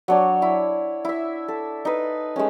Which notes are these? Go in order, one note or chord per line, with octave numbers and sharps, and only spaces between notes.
F#3 D4 C#5
E4
E4 E5
A4
D#4 B4
G#3 A3 C#4